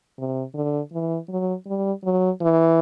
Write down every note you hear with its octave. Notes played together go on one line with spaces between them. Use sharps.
C3
D3
E3
F#3
G3
F#3
E3